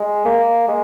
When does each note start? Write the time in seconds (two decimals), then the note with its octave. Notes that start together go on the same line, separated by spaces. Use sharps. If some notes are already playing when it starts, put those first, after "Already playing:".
Already playing: G#3
0.25 A#3
0.68 G#3